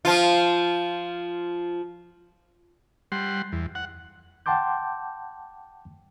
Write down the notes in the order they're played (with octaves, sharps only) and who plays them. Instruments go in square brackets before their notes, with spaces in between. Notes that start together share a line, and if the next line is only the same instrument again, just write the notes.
[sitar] F3 F4
[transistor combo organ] G3 F#5 C6
E2
F#5
[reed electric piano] F#5 G5 A5 C6 D6 G6